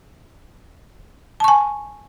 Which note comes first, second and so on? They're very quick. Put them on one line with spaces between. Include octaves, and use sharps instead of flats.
A5 C#6 G#5